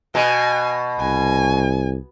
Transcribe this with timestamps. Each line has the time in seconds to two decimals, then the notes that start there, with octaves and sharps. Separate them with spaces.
0.15 B2 G#5
1.00 C2 G#5